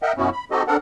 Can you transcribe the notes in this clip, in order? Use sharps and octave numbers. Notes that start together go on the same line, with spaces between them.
A#4 D#5 E5 F#5 G5
F#2 B2 B3 C#4 E4 F#4
B5
C4 D#4 F#4 G4 A4 D#5
C4 D4 A4 A#4 F#5